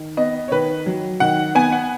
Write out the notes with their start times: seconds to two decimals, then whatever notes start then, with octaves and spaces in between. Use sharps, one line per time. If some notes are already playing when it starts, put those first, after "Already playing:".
Already playing: D#3
0.17 B3 D#5
0.48 C#5
0.52 D#3 B4
0.86 F#3
1.20 D#3 F#5
1.55 B3 G#5
1.72 F#5